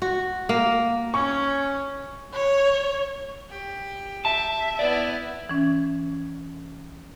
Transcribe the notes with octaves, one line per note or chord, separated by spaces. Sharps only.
F#4
A#3
C#4 C#6
C#5
G4
E5 A5
B3 E4 D5
E3 C#4